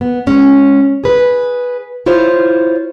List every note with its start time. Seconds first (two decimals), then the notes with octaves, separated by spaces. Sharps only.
0.01 B3
0.27 G#3 C#4
1.04 G#4 B4
2.06 E4 F4 C5 C#5